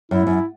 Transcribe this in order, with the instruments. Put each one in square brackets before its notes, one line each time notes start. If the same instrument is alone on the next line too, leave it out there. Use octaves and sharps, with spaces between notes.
[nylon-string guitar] F#2 [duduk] E4
[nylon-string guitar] F#2